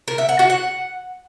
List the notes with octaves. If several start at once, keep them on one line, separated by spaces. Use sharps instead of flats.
A#4
E5
F#5
F#4
F#5